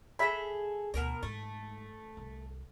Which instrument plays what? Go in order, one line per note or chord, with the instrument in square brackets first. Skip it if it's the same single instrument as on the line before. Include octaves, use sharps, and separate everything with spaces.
[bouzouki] G#4 A4 [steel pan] E5 B5
[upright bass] D2 [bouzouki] B2 A#4 A#5
[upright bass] G#2 [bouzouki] A3
[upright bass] C2